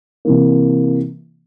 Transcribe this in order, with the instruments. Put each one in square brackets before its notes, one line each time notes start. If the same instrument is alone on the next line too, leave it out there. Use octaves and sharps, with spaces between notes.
[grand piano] C3 E3 A#3